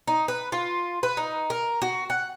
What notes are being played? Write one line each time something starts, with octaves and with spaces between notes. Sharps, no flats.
D#4
B4
F4
B4
D#4
A#4
F#4
F#5